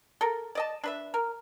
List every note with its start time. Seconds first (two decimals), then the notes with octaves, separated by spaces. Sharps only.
0.21 A4 A#4
0.55 D5 D#5 A5
0.84 D4 B4 E5
1.14 A#4